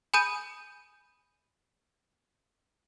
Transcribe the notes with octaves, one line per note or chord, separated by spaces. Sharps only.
G#5 B5 D#6 G6 D#7